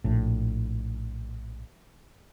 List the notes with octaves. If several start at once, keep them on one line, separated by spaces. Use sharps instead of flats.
A#1 A2